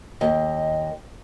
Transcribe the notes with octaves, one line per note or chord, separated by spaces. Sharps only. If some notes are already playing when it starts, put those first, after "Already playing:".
D#2 D#5